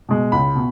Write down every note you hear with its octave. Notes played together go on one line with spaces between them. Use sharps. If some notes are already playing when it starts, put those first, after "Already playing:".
B2 G#3
C#2 B5
B2